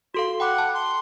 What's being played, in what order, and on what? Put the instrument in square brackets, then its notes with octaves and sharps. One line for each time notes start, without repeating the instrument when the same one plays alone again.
[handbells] F#4 A4 F5 [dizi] C6
[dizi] F#5 [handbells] G5 B5 D6
[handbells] A5
[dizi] C6